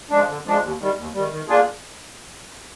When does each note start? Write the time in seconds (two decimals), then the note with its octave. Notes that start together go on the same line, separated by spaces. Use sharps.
0.10 F3 G#3 D4
0.28 D3
0.45 F3 G#3 D4
0.62 D#2
0.79 D#3 G3
0.97 D#2
1.13 D#3 G3
1.31 D#3
1.48 A#3 D4 F4 G#4